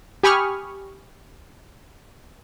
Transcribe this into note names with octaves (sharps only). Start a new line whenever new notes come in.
G4 G#5 B5 C#6 D#6 F6